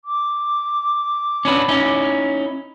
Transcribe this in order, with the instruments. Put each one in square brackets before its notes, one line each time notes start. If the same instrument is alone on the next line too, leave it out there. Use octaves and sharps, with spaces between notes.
[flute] D6
[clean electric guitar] C#4 D4 B4
C#4 D#4 E4